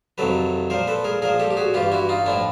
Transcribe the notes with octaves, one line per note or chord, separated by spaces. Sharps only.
F2 C3 D#3 F#3 A4 B4
A#2 F3 A#4 C5
A4 B4
G#4 A#4
A#2 F3 G#4 A#4
G4 A4
G4
F#4 G#4
G2 E3 F4 G4
E4 F#4
D#4 F4
A2 F3 D4 E4